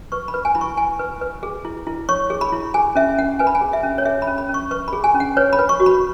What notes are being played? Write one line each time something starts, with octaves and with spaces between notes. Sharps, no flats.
B4 C#6
B5
B4
G#5
E4 B5
C#6
E4 G#5
B4
B4
G#4
E4
E4
C#5 C#6
G#4
B5
E4
G#4 G#5
C#4 E5
C#4 F#5
B4 G#5
B5
G#5
G#4
E5
C#4
C#5
G#4 E5
B5
C#4
B5
C#4
C#6
B4 C#6
G#4 B5
G#5
C#4
F#5
B4 C#5
B5
B4
C#6
F#4
B5